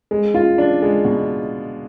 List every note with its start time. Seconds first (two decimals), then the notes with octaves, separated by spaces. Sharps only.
0.11 G#3
0.34 F4
0.58 D4
0.82 G#3
1.05 B2